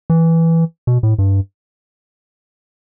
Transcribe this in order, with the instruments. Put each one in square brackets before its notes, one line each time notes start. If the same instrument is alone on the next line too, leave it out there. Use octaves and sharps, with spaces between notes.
[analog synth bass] E3
B2
A2
G2